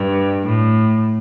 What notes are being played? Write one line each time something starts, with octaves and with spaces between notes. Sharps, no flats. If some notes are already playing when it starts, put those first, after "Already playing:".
Already playing: G2
A2